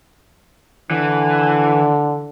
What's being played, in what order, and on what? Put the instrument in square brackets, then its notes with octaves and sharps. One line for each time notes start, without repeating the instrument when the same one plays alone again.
[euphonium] D3 [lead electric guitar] E3